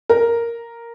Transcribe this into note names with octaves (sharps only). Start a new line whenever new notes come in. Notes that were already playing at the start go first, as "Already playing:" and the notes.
A#4